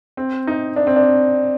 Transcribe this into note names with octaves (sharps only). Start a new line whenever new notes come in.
C4
D#4
D4
C4
D4